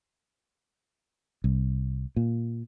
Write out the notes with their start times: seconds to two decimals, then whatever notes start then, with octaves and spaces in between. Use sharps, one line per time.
1.44 C2
2.16 A#2